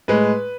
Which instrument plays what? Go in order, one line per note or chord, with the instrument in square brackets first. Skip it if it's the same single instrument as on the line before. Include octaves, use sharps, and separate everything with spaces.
[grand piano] A2 G#3 B4